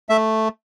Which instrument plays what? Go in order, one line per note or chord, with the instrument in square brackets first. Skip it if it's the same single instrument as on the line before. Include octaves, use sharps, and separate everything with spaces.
[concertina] A3 E5